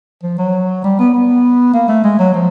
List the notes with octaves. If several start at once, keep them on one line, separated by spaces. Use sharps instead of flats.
F3
F#3
G3
B3
B3
A#3
A3
G#3
F#3
F3